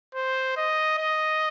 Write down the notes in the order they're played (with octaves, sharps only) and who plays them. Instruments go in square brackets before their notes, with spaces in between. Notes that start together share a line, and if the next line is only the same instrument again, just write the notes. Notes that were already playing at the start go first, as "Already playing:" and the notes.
[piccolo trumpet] C5
D#5
D#5